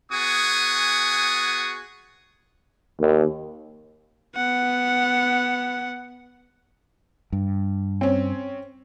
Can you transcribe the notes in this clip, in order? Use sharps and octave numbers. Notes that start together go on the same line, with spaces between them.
B3 F#4 G#4 G#5 C#6 D#6
D#2
B3 F#5
G2
C4 C#4